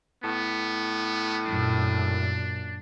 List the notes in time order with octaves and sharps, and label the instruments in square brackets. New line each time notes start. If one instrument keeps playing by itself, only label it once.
[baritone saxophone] A2 [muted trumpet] B3
[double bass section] F#2 A#2 [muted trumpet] D4